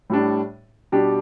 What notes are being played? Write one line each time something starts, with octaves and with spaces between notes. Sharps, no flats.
A2 G3 D4
B2 G3 D4 G4